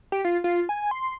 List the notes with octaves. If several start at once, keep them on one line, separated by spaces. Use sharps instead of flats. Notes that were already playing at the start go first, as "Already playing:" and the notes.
G4
F4
F4
G#5
C6